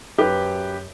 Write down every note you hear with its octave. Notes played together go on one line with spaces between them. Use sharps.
F#2 G4 B4